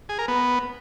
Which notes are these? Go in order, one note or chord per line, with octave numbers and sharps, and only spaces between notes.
G#4
A#4
B3